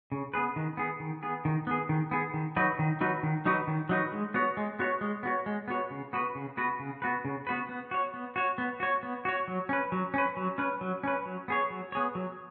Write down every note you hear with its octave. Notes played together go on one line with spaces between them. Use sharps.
C#3
B3 G#4 B4
D#3
B3 G#4
D#3
B3 G#4
D#3
B3 G#4
D#3
B3 G#4
D#3
F#3 D#4 F#4 B4
D#3
F#3 D#4 F#4 B4
D#3
F#3 D#4 F#4 B4
D#3
F#3 D#4 F#4 B4
G#3
B3 F#4 C#5
G#3
B3 F#4 C#5
G#3
B3 F#4 C#5
G#3
B3 F#4 C#5
C#3
B3 F#4 B4
C#3
B3 F#4 B4
C#3
B3 F#4 B4
C#3
B3 F#4 B4
B3
F#4 C#5
B3
F#4 C#5
B3
F#4 C#5
B3
F#4 C#5
F#3
C#4 B4
F#3
C#4 B4
F#3
C#4 B4
F#3
C#4 B4
F#3
B3 G#4 C#5
F#3
B3 G#4 C#5
F#3